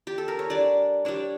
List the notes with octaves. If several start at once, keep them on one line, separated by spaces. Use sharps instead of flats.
G4
A4
A#4
C#5
G3 D4 D5
G3 D4 C#5